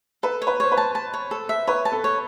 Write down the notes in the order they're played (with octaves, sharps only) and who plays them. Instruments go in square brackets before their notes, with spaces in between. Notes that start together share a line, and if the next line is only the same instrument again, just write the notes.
[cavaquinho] A4 [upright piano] B4
[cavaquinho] C#5
[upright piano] B4
[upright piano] C5 [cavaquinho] C#5
[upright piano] B4
[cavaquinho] A5
A5
C#5
A4
E5
[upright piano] B4 [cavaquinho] C#5
[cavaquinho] A5
[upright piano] A4
[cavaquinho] C#5